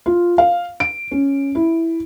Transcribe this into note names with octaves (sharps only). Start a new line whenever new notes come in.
F4
F5
D7
C#4
E4